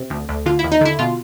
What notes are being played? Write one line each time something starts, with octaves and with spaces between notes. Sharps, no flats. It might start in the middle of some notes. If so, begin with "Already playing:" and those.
Already playing: C3
D2
D2
D3 F4
E4
D#2
D#4
D3 E4
B2 F4